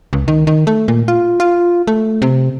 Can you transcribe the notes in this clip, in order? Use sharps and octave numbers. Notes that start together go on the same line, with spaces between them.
C#2
D#3
D#3
A3
A#2
F4
F4
A3
C3